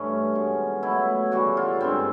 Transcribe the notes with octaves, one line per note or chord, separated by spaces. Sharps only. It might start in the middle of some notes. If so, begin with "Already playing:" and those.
Already playing: G2 E3 A3 C#4
B2 G#3
B2 F#3 A3 E4
C#3 E3 G3 F#4
F4
G2 E3 G#3 C4